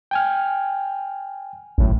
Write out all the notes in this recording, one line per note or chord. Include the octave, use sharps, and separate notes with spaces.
G5 G#5 F6
G#1 F#2 A2